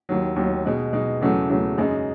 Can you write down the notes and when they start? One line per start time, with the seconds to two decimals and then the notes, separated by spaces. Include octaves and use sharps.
0.09 D#2 D#3 F#3
0.36 D#2 D#3 F#3
0.65 B2 G#3 D#4
0.93 B2 G#3 D#4
1.21 E2 C#3 F#3 A3
1.49 E2 C#3 F#3 A3
1.78 F#2 C#3 G#3 D#4